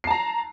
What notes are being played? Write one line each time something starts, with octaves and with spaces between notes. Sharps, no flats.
A5 A#5 C7